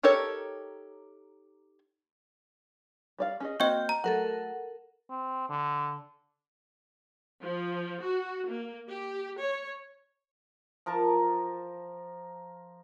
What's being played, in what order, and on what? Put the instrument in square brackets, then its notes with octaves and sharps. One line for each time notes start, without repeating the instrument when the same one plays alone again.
[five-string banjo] D#4 G4 A4 A#4 C#5
G3 D5 F5
C#4 G#4 D#5
[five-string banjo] A#3 C4 F#4 [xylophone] D#5 G5 C#6 [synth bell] G6
[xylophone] A#5
[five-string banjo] F#3 A3 [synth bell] A4 A#4 F#5
[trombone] C4
D3
[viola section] F3
F#4
A#3
G4
C#5
[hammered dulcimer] F3 A#4 A5 A#5